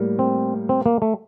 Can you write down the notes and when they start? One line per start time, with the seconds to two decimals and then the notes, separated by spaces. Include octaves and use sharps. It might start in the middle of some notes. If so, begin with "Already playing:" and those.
Already playing: A2 G3 A#3
0.19 C4
0.69 C4
0.86 A#3
1.02 A3